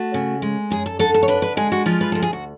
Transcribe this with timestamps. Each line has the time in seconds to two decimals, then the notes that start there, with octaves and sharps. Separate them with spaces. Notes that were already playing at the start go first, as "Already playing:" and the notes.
Already playing: A3 F#4
0.14 C#3
0.42 G#3
0.70 F#2 G#4
0.86 A4
0.99 D3 A4
1.14 A4
1.23 C#5
1.28 D4 B4
1.42 B4
1.57 G#3 G#4
1.72 F#4
1.86 F3 F4
2.01 B4
2.12 D2 A4
2.22 G#4
2.33 F#4